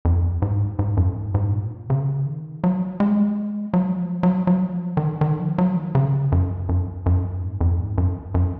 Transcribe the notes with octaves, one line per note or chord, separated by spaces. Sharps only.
F2
G#2
G#2
F#2
G#2
G#2
A#2
C#3
D#3
F#3
G#3
F#3
F3
F#3
F#3
F3
D#3
D#3
F3
F#3
D#3
C#3
F#2
F#2
F#2
G#2
F2
G#2
F#2
F#2